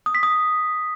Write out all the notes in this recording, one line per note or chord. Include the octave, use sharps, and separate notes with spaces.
D#6
B6
D#6